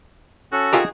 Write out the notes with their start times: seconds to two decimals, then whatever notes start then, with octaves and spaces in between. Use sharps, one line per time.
0.52 C#4 F#4 A4
0.73 D#3 F4 G4 G#4 A#4